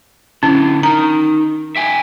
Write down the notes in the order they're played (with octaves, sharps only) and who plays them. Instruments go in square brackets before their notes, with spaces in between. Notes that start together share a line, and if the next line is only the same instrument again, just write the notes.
[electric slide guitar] D3 E4 [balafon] C#4
[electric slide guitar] D#4 A#4 [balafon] A#5
[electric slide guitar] E5 G5 G#5